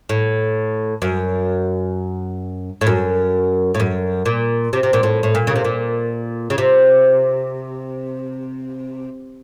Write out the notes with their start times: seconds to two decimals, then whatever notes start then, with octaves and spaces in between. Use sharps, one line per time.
0.09 A2
1.02 F#2
2.81 A2
2.87 F#2
3.75 A2
3.80 F#2
4.26 A#2
4.73 C3
4.83 C3
4.93 A#2
5.03 A2
5.23 A2
5.35 A#2
5.47 C#3
5.56 C3
5.65 A#2
6.50 C#3
6.58 C3